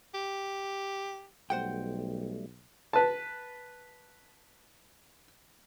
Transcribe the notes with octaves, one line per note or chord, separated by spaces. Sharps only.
G4
B1 G3 A3 C5 F#5 G5
B4 A5